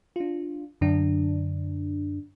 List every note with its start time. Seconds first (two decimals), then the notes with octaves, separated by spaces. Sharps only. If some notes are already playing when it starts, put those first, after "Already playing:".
0.16 D4 F4
0.81 F#2 D3 D4